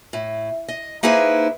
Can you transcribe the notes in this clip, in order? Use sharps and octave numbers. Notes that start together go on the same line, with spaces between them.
A2
D#5
A#3 D#4 E4 G#4 B4 C5